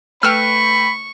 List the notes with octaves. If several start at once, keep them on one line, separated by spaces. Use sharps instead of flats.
A3 B4 G5 B5 C#6 E6 F6